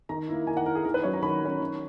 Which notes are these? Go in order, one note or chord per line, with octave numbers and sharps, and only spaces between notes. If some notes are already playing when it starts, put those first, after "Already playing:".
D#3 A#5
A#3 E4
D#3 G#5
F#5
A#3 E4 A#4
G#4
D#3 A#4
B4
F#3 C#4 C#5
A#5
D#3 B5
F#3 C#4
D#3